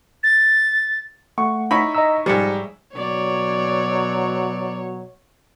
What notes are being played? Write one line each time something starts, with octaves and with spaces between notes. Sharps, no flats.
A6
A3 F#5 C#6
D#4 E4 C#5 B5
D#5 A#5 E6
G#2 F3 G3 C#7
B2 F#3 C#5 D5